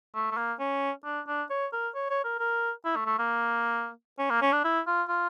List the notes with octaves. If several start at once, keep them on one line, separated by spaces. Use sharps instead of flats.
A3
A3
A#3
C#4
D4
D4
C#5
A#4
C#5
C#5
A#4
A#4
E4
A3
A3
A#3
C#4
A#3
C#4
D4
E4
F4
F4